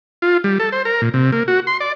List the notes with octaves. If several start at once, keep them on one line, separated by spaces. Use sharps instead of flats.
F4
G3
A4
C5
A#4
A#2
C3
A#3
F#4
C6
D5